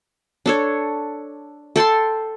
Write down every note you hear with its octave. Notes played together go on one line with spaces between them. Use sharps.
D4 A4 C#5
A4 G5 A5 C6